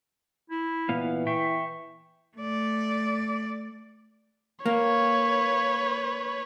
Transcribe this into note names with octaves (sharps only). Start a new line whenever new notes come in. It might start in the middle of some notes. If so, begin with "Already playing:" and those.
E4
A#2 E3 B3 F5
E5 G5 C#6
A3 D5
A#3 B4 C#5